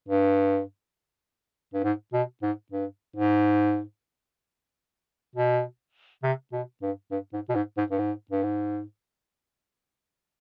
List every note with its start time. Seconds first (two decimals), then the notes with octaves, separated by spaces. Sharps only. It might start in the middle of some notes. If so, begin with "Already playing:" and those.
0.08 G2
1.74 G2
1.84 G#2
2.13 B2
2.42 G#2
2.72 G2
3.16 G#2
5.35 B2
6.23 C3
6.52 B2
6.82 G2
7.11 G2
7.33 G#2
7.49 B2
7.55 G#2
7.77 G#2
7.91 G2
7.98 G#2
8.31 G2
8.43 G#2